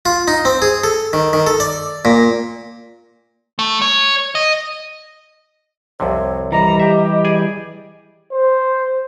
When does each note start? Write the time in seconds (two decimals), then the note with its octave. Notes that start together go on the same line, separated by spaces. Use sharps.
0.06 F4
0.28 D#4
0.45 C4
0.62 G#4
0.84 A4
1.13 D#3
1.33 D#3
1.47 A4
1.60 D5
2.05 A#2
3.59 A3
3.82 C#5
4.35 D#5
6.00 C2 F2 C3 C#5
6.52 E3 G3 D#5 A#5
6.80 G4 E5
7.25 G#4 D5 G#5
8.32 C5